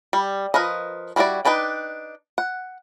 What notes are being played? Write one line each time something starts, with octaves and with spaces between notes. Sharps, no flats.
G3
F3 A#4 B4 D#5
G3 D4 E4 F#4 D5
D4 D#4 B4 D5 G5
F#5